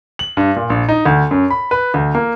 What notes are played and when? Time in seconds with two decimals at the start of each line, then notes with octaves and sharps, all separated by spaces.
0.19 F#7
0.37 G2
0.56 A#2
0.70 A#1
0.89 D#4
1.05 D2
1.31 F#2
1.50 B5
1.71 B4
1.94 D2
2.15 A#3